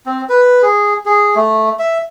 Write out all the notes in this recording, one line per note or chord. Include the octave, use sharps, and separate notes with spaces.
C4
B4
G#4
G#4
A3
E5